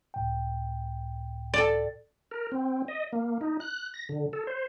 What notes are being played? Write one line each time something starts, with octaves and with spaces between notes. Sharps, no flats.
C#2 A2 G5
A4 D5
A#4
C4
D#5
A#3
D#4
F#6
A#6
D3
A4
C5